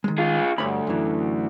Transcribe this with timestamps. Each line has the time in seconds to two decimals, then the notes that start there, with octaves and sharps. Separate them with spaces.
0.04 D#3 G#3
0.18 F4 G#4
0.58 D2 G2 C#5 B5
0.87 F#2 E3